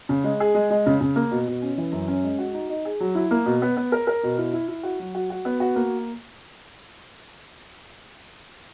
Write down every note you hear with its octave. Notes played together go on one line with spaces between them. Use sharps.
C#3
G#3
G#4
G#3
G#3
C#3
C#3
A#3
B2
B2
C#4
E3
F#2
C#4
G#3
F#4
D#4
D#4
G#4
F#3
E4
A#3
B2
B3
B3
A#4
A#4
B2
E4
E4
E4
F#4
F#3
F#4
F#4
B3
F#4
A#3